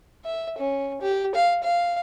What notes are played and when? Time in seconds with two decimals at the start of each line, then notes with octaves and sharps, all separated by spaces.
0.25 E5
0.58 C#4
1.01 G4
1.35 F5
1.63 F5